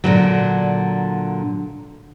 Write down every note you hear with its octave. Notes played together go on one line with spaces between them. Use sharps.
A#2 D3 E3 F#3